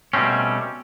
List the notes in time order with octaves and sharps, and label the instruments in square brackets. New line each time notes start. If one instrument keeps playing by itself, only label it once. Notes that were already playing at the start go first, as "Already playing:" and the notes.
[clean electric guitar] B2 G3 A3 C4 C#4